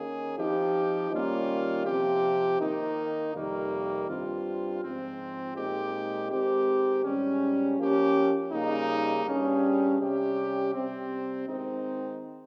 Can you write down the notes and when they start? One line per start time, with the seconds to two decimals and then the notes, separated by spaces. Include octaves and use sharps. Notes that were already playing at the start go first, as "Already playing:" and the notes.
Already playing: D#3 A#3 C#4 G#4
0.37 F3 C4 D#4 G4
1.11 D#3 G3 A#3 C#4 F4
1.86 C3 F3 C4 G4
2.59 D#3 A#3 D#4
3.34 F2 C3 D#3 G3 A#3
4.08 G2 G3 C4 F4
4.81 G#2 F3 C4
5.56 A#2 G#3 C4 D#4 G4
6.29 D#3 G#3 C4 G4
7.04 G#2 G3 C#4
7.78 F3 A#3 C#4 G4
8.52 C#3 G3 A#3 D#4
9.25 G2 G3 C#4 G#4
10.00 C3 G3 C#4 G4
10.74 C3 G3 C4
11.47 D#3 G#3 C4 D#4